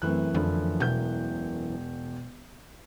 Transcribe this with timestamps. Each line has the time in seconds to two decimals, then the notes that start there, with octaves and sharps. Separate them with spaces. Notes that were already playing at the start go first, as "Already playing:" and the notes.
0.02 F#2 E3 A3 C4 B4 F#6
0.34 F2 D3 F3 E4
0.80 E1 B2 G6